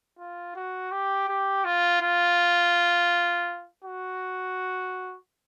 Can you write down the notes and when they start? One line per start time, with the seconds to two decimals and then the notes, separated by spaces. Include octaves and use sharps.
0.19 F4
0.56 F#4
0.92 G4
1.28 G4
1.65 F4
2.01 F4
3.85 F#4